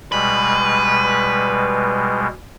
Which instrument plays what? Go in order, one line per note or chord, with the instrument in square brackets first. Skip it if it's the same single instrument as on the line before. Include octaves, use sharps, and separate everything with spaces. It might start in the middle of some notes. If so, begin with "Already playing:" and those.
[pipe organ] B2 G3 G#3 [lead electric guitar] B4